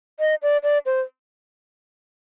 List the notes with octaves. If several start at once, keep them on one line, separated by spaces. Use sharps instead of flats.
D#5
D5
D5
C5